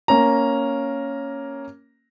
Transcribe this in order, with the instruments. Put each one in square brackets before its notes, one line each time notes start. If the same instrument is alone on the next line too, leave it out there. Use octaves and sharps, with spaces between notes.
[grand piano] A#3 C#4 A#5